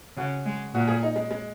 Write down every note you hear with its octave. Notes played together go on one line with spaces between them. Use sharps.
C#3 F#4
G#3
A#2 F#4
G#4
D#4
G#3
G#3